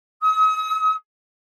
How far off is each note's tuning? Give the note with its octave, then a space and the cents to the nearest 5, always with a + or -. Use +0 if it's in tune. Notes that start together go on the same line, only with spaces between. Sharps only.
D#6 +40